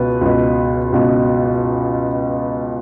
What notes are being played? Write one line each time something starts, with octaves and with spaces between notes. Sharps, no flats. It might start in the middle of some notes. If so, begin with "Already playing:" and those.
Already playing: C#2 B2 B4
C#2 B2
C#2 B2